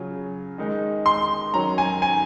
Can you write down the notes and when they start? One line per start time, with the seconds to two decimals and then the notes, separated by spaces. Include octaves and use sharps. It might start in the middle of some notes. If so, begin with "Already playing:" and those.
Already playing: C#3 F#3 C#4 F4
0.58 D#3 G#3 D#4
1.06 C6
1.54 D#3 F#3 C#4 A#5
1.78 G#5
2.02 G#5